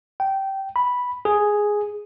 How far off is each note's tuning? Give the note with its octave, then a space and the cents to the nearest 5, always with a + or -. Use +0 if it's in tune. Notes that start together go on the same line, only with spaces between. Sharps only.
G5 -15
B5 -5
G#4 +0